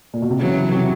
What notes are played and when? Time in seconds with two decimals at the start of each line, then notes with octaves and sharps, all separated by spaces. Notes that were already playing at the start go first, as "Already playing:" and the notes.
0.14 A#2
0.22 B2
0.30 C3
0.38 C#3 E3 F#3
0.72 C3